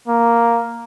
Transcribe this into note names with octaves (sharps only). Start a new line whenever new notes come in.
A#3